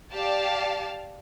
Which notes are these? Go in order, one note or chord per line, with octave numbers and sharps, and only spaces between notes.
G4 D5 F5 A5